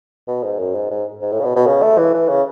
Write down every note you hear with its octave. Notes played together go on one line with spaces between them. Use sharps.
B2
G#2
F#2
G#2
G#2
G#2
A2
C#3
B2
B2
C#3
A3
E3
E3
C#3